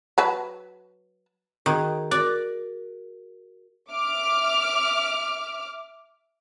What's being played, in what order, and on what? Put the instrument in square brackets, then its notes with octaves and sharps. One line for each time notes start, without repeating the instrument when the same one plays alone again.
[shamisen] F#3 B4 A5
[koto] D#3 [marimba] F#4 G#4
[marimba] F#4 A#4 [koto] D5
[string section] E5 D6 F6